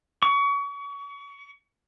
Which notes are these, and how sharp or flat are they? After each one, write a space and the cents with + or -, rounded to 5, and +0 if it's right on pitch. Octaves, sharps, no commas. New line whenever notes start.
C#6 +30